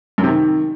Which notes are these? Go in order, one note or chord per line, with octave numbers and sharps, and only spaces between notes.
F#2
C3
D#3